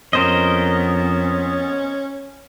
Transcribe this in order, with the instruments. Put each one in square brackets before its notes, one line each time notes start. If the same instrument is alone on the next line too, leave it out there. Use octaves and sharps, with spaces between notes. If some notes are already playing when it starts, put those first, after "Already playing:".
[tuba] F2 [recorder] B3 [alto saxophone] C#4 [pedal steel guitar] A#4 C5 D#5